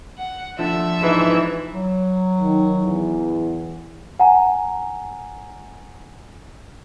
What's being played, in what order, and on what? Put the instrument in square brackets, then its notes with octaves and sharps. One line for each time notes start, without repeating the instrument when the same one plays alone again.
[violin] F#5
[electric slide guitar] F3 D4 A4 [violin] E5
[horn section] G#2 E3
[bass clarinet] F#3
[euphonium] D#3
E2
[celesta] F#5 G#5 A#5